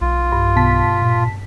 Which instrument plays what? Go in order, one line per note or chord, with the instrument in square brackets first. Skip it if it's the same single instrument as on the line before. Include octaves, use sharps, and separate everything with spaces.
[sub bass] B1 [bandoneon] F4
[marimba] G2
[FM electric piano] B2 A5 B6
[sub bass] A#2